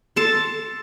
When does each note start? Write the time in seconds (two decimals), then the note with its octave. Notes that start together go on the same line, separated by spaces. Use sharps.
0.16 A4 A5 C6